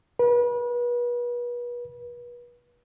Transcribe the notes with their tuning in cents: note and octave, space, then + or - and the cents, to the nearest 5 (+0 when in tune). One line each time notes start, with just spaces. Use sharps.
B4 -35